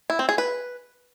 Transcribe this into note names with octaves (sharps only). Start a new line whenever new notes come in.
E4
C4
G#4
B4